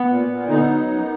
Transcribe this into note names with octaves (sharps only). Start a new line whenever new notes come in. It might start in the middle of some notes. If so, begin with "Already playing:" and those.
Already playing: B3
A#2
A#2
D3 B3 D#4
F#3
F#2